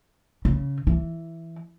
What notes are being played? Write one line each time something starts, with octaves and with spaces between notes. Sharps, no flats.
C#3
E3